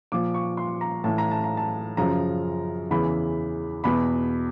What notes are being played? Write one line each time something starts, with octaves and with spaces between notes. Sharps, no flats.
A#2 F3 D6
C#6
C6
A#5
A2 E3 A5
A#5
A5
A#5
A5
F#2 C#3 F3 A#5
E2 C#3 E3 B5
E2 B2 B5